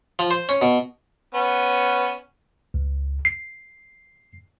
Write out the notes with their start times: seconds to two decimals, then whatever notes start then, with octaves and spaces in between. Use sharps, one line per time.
0.19 F3
0.31 C5
0.49 C#4
0.62 B2
1.34 B3 C#4
2.74 C#2
3.25 C7